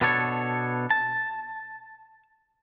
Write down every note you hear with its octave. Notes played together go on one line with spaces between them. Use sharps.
B2 B3 D4 A4 C#5
A5